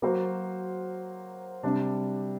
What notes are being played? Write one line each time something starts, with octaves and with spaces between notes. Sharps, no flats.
F#3 A#3 F#4 C5
C3 G3 D4